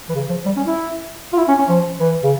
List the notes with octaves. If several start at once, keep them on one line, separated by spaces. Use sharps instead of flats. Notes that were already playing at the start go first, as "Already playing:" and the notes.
E3
C#3
F3
G3
C#4
E4
F4
E4
C#4
C#4
F3
E3
C#3